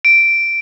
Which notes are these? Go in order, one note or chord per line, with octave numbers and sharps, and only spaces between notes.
D7